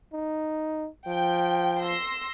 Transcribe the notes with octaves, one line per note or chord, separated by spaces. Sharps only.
D#4
F3 G5
C6 E6 A#6